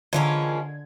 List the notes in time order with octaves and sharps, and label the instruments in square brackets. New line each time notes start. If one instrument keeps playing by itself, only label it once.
[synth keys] D3 G#6 [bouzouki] E3 F4 A#4 [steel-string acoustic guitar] F3 G#3 C#4